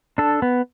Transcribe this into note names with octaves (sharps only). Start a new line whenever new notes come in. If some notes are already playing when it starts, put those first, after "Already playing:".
D4 A4
B3